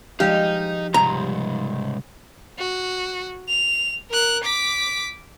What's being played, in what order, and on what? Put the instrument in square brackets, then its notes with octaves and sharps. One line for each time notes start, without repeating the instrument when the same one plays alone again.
[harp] F3 G#3 [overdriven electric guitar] D#4 [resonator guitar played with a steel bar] G4 F5
[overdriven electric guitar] C#2 G#2 [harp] C3 G3 D#7 [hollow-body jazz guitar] A#5
[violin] F#4
F7
A#4 F#6
D6 B6